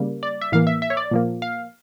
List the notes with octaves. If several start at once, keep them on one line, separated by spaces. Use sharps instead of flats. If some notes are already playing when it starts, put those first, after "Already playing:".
Already playing: C#3 G3 A#3
D5
E5
A2 E3 A#3 F5
E5
E5
C#5
D5
A#2 F3 A#3
F5